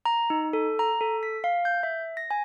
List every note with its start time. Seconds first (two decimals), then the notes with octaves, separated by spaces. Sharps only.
0.05 A#5
0.30 D#4
0.53 A4
0.79 A#5
1.01 A4
1.23 B6
1.44 F5
1.65 G6
1.83 E5
2.17 A#6
2.31 G#5